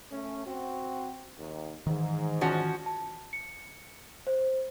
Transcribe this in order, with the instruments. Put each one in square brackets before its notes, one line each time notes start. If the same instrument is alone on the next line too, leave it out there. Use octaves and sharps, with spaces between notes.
[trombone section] A3 C#4
C4 F#4
D#2
[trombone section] G#2 [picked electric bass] D#3 E3
[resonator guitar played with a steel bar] F3 C#4 F#4
[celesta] A5
C#7
C5